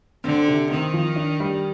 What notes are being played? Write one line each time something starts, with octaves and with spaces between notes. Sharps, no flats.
D3 C4
C3
D#3 C4
F3
D4
G3